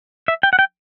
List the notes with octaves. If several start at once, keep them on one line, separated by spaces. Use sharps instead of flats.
E5
G5
F#5
G5